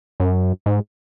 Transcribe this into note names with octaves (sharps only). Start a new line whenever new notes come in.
F#2
G#2